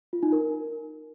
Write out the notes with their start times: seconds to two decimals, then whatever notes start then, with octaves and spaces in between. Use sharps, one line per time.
0.13 F4
0.23 D#4
0.32 A#4